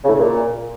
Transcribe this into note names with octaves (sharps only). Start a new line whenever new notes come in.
C#3
A2
C#3
A#2